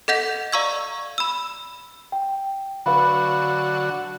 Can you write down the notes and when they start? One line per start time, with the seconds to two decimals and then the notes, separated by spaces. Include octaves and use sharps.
0.08 A4 D#5 F#5 G6 B6 F7
0.52 D5 F5 A#5 C#6 E6 G#6
1.18 B5 E6
2.12 G5
2.86 D3 F#3 F#4 B4 F5 B5